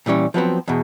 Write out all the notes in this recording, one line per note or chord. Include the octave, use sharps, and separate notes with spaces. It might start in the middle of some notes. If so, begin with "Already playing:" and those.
A#2 E3 G3 C#4
F3 F#3 B3 C4
E2 B2